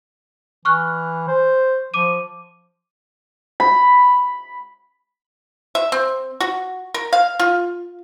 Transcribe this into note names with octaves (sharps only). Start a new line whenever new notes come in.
E3 C#6 F6 F#6
C5
F3 D6 D#7
B5
E5
C4
F#4
A#4
F5
F4